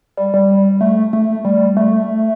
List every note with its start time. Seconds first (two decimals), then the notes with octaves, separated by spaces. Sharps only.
0.17 G3
0.34 G3
0.81 A3
1.13 A3
1.45 G3
1.77 A3